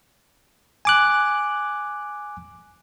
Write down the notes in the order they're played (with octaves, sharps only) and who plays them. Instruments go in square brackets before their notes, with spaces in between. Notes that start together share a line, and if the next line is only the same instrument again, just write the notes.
[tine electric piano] G#5 D6 F#6